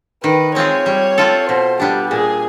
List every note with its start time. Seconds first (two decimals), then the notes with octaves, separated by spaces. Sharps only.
0.24 D#3 B4
0.55 G#3 C4 F4 G#4 C#5
0.86 G3
1.18 C4 F4 A4
1.49 B2 C5
1.80 G3 B3 D4 G4
2.11 A#2 G#4